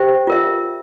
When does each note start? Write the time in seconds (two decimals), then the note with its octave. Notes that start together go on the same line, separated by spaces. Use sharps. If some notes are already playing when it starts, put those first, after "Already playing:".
Already playing: G4 C5 E5 G5
0.27 F4 A#4 E5